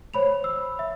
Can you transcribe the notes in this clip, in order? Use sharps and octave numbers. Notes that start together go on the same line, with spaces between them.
C5 C#5 B5 F7
E6
E5